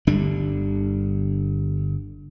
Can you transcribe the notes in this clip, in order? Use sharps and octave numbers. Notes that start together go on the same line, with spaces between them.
G1 D3 G3 D4